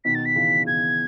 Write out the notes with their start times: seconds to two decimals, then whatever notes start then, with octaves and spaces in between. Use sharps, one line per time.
0.05 B2 D#3 B6
0.15 A6
0.25 B6
0.36 C#3 E3
0.66 C#3 E3 G#6